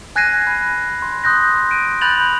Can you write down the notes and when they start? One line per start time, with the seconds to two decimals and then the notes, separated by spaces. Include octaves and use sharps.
0.16 G#5 F#6 G#6 A#6 C7 D#7
0.47 B5
1.02 C6
1.24 C6 D#6 F#6 G6 A#6
1.71 D7 D#7
2.01 B5 F#6 G6 A6 F7 F#7